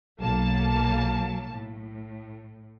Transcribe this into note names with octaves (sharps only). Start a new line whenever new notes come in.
B1 F#3 A#3 A5
A2